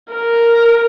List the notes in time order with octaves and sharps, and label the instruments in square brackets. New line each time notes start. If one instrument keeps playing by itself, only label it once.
[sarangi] A#4